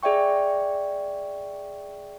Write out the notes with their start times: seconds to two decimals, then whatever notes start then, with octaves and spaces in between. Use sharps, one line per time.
0.03 G#4 D5 E5 G5 C#6